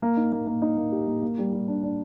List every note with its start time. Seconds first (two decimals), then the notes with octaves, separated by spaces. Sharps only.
0.02 A#3
0.17 D#4
0.32 A#3
0.47 A#3
0.62 D#4
0.77 A#3
0.92 G4
1.07 A#3
1.22 A#3
1.38 G3
1.52 G3
1.68 D4
1.83 D4